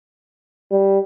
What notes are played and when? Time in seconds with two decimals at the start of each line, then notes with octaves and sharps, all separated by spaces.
0.72 G3